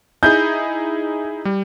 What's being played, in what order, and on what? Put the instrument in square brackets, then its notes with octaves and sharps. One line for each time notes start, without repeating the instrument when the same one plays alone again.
[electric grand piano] D#4 E4 G#4 [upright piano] G6
[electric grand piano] G3